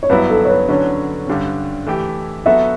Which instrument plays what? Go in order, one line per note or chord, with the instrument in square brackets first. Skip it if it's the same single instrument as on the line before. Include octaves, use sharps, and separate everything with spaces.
[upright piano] C#5
[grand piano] G2 F#3 B3 E4 [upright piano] B4
[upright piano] A4
C#5
B4
[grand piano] D3 F#3 C#4 [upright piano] C#5
[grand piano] G2 D3 G3 C#4
E3 A3 E4 G4
[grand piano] F#3 B3 F#4 A4 [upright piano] E5